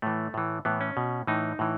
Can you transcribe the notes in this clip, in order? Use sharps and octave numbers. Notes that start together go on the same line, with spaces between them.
A2 E3 A3
A2 E3
A2 E3 B3
C#4
B2
A2 E3 D#4
A2 E3